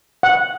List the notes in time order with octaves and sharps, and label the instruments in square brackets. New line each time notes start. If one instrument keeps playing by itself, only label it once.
[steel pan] F#5